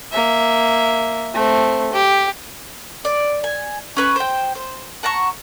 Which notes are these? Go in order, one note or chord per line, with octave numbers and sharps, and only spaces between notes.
A#3 E5
A3 C4
G4
D5
G#5
C#4 B4 C#6
C5 G5
C5
F#5 A5 A#5 C#6